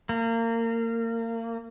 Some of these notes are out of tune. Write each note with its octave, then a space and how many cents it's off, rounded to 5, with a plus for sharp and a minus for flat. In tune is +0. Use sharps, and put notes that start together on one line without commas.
A#3 -30